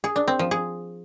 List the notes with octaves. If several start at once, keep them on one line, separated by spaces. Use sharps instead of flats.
G#4
D4
C4
F3
G#4